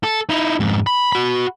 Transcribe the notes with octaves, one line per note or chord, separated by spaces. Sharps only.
A4
D#4 E4
F2 G#2
B5
F#4 B5